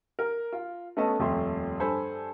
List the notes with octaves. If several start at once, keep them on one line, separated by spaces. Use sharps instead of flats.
A#4
F4
A3 B3 C#4 A4 D#5 A5
D#1 F2 A3 E5 C6
G2 A4 C5 G#5 B5